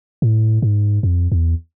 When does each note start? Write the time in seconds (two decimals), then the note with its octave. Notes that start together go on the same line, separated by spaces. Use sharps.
0.22 A2
0.62 G#2
1.03 F2
1.32 E2